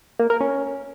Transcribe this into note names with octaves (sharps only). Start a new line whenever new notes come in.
A#3
A#4
C#4